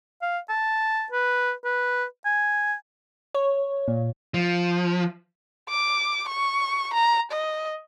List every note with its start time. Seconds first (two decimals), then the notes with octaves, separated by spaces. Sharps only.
0.22 F5
0.49 A5
1.12 B4
1.64 B4
2.25 G#5
3.35 C#5
3.88 A#2
4.34 F3
5.69 D6
6.28 C#6
6.93 A#5
7.31 D#5